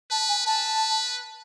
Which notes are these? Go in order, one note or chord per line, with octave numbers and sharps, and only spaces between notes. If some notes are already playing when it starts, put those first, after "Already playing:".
B4 A5
G#5
B4 A5